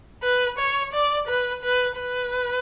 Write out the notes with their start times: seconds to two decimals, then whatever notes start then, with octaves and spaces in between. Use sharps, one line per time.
0.23 B4
0.58 C#5
0.93 D5
1.28 B4
1.63 B4
1.97 B4